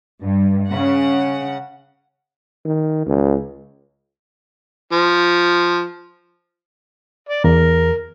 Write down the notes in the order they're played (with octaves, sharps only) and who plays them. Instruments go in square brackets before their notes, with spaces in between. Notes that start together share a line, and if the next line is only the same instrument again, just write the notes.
[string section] G2
C#3 F#5
[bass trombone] D#3
C#2
[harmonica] F3
D5
[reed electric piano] E2 [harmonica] A#4